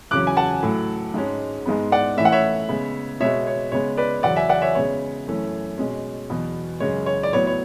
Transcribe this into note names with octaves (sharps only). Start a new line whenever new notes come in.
E2 C#3 F#3 C#4 D6 F#6
G#5
F#5 A5
A2 F#3 A3
G#2 G#3 C#4
G#2 G#3 B3
D5 F#5
A2 E3 A3 C#4 E5
F#5
C#5 E5
C#3 G#3 B3
B2 G#3 B3 C#5 E5
C#5
C#3 G#3 B3 C#5
B4 D5
E2 C#3 F#3 C#4 D5 F#5
E5 G#5
D5 F#5
C#5 E5
C#3 G#3 B3 C#5
F#2 E3 A3 C#4
B2 G#3 C#4
E2 B2 F#3 B3
F#2 C#3 G#3 C#4 C#5
C#5
D5
A2 F#3 B3 C#5
C#5